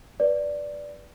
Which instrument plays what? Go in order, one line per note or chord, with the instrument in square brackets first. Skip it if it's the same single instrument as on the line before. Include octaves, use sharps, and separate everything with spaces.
[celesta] B4 D5